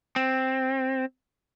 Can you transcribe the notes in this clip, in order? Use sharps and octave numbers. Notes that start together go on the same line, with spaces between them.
C4